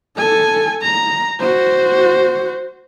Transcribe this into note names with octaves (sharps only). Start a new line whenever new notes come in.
A4 G#5
A#5
F#4 C5